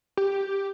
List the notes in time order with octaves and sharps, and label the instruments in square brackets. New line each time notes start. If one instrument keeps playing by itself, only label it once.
[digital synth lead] G4